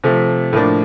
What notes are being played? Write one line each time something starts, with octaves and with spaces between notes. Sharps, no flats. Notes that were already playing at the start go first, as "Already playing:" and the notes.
C3 F3 A3
A2 F3 A#3 D4